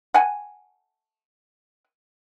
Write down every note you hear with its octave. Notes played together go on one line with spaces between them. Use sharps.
F#5 G#5